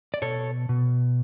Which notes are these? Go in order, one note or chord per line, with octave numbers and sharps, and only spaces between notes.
D5
B2 A4 C#5
B2